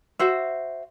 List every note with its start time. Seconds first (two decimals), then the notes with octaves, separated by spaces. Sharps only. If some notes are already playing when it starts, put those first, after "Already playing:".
0.19 F#4 C5 E5